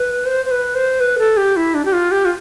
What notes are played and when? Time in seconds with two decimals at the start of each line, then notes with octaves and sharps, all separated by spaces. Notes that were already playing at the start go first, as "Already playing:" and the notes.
Already playing: B4
0.26 C5
0.45 C5
0.51 B4
0.75 C5
1.00 B4
1.19 A4
1.37 G4
1.56 E4
1.74 D4
1.85 G4
1.93 F4
2.11 G4
2.25 F4